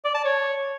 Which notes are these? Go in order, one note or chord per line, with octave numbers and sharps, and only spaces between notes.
D5
A5
C#5